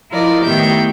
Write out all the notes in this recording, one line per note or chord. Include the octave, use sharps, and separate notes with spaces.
F3 E4 F4 A#4 D5 D#5
A2 D#3 B3 G4 E5 G6